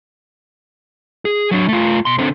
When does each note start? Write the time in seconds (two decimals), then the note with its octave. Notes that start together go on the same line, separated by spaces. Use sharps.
1.25 G#4
1.51 F#3 D4
1.68 A3 F4
2.05 B2 C6
2.18 D3 C4